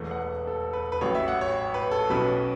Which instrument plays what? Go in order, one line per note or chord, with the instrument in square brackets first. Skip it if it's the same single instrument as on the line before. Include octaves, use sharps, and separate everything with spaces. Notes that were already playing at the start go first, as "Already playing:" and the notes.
Already playing: [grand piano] E1 E2 E3 A3
F#5
A4
B4
B4
A1 A2 F#3 C#5
E5
F#5
C#5
B4
A4
B1 B2 F#3 C#4 B4